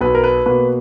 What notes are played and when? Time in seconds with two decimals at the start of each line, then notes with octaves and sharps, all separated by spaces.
0.01 B1 B4
0.15 A#4
0.24 B4
0.46 B2 A#3 B4